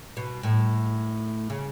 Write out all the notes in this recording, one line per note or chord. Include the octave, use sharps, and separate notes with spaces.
B2
A2
C#3